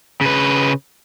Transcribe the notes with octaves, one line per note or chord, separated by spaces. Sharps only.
C#3 B4